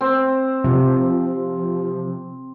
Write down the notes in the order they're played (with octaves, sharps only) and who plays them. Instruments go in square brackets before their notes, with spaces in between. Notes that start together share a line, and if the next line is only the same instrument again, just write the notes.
[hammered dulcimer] C4
[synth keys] C3 [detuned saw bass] F3